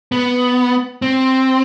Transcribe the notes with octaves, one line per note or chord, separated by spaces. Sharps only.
B3
C4